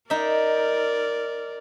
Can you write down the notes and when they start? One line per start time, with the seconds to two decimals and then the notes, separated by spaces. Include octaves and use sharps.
0.10 D#4 A#4 D5 E5